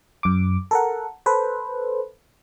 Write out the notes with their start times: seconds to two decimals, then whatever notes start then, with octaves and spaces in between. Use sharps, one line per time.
0.23 F#2 D6
0.71 A4 A#4 F#5
1.26 A4 B4 C5